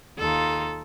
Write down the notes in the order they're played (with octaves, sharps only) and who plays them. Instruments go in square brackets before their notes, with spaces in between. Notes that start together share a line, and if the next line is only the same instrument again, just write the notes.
[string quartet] D#2 D#4 F4 [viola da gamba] A4